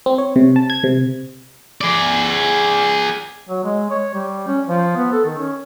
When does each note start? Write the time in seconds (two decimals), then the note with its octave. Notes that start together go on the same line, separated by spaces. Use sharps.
0.06 C4
0.18 C#5
0.36 C3
0.56 A5
0.70 G#6
0.84 C3
1.81 G#4 D5
3.49 F#3
3.64 G#3
3.90 C#5
4.14 G3
4.47 C#4
4.67 F3
4.96 B3
5.12 A4
5.25 D#3
5.38 C#4